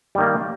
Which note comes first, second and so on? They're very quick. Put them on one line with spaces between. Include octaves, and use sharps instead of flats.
G3 D#3 A#3